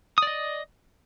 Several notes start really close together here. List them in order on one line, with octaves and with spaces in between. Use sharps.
D#6 D5 D#5